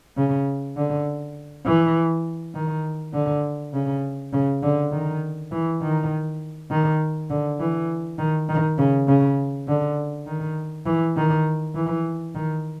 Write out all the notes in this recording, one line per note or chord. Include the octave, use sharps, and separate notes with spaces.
C#3
D3
E3
D#3
D3
C#3
C#3
D3
D#3
E3
D#3
D#3
D3
E3
D#3
D#3
C#3
C#3
D3
D#3
E3
D#3
E3
D#3